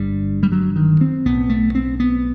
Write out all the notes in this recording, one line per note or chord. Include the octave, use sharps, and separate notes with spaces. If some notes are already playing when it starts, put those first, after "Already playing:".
Already playing: G1 G2 G3
G3
F#3
D#3
C4
B1 A2 B3
A3
C4
B3